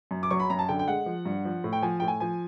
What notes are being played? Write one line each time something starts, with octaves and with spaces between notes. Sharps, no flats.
F#2
D6
F#3 C#6
B5
F#2 A#5
A5
D3 G5
G5
G#3 F#5
F3
G2
F3
A2
G5
F3 G#5
A2 G5
G#5
F3 G#5